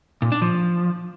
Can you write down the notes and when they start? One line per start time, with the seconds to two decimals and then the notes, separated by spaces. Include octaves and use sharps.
0.22 A#2
0.32 D4
0.42 F3